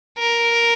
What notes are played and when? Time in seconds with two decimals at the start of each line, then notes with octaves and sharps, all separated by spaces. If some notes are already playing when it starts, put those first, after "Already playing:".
0.18 A#4